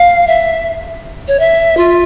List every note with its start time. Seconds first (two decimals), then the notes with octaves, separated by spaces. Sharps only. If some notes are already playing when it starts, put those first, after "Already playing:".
Already playing: F5
0.27 E5
1.28 C#5
1.39 E5
1.77 F4